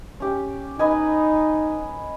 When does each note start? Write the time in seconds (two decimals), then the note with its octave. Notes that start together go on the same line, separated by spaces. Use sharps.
0.20 C#4 G4
0.79 D#4 B4 D#5 G#5